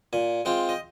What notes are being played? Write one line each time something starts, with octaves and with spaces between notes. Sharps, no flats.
A#2 G#5
G#3 C4 F4 G5
D#5